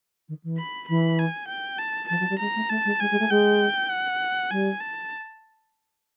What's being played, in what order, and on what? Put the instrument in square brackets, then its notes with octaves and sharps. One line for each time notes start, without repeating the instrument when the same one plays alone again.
[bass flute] D#3
E3
[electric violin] B5
[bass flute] E3 [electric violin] B5
[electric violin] G#5
G5
A5
[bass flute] F3 [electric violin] A5
[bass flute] F#3
G3
[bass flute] G#3 [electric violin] A#5
[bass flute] A3
[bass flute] A3 [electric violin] A5
[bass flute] G#3
[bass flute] G#3 [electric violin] G#5
[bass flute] G#3
A3
[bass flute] G#3 [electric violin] G5
[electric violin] F#5
[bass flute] G3 [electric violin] G#5
[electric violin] A5